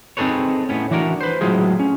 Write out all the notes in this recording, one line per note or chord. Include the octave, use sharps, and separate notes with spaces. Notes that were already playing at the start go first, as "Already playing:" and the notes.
C4 D#4 G#4 A4 B4 C#5
A2 B3 C#4
E3 D4 F#4 A#4
B4 C5
A2 F#3 G#3 F4 G#4
C#4